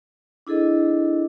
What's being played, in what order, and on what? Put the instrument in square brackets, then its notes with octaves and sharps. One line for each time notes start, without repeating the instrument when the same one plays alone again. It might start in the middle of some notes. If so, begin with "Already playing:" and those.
[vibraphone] D4 E4 G#4 A4 D#5